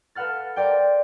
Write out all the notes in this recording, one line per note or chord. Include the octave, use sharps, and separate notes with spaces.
A4 B4 F5 F#5 F6 A6
A#4 C5 D5 G5